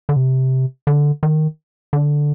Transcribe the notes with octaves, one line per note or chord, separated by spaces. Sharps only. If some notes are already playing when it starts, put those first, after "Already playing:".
D3
C3
D3
D#3
D3